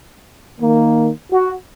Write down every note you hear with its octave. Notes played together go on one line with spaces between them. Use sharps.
D#3 A#3
F#4